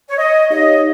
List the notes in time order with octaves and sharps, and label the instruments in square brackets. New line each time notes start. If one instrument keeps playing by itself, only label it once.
[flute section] C#5
D#5
[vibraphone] D#4 G4 C#5 F5 [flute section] D#5